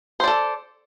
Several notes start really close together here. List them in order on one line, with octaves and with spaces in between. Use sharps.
C5 D5 A4